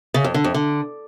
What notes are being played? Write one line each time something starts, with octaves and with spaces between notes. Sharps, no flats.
C#3
F2
D3
F2
D3